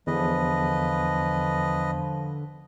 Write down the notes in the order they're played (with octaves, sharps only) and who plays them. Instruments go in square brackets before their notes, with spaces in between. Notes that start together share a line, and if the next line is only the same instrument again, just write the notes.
[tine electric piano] E2 [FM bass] D3 [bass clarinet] F3 [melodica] B4 D#5